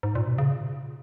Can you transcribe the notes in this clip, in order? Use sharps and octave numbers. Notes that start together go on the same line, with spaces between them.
G#2
A#2
B2
C#3